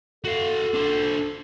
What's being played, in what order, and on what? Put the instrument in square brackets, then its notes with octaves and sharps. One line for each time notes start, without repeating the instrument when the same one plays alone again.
[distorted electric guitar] F#4 F5 [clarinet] A4
[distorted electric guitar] D4 C5